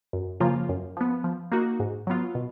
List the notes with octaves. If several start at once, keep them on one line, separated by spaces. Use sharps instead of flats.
F#2
C#3 F3 A#3 F4
F#2
F3 B3
F3
A#3 D#4 F#4
G#2
F#3 B3 F4
B2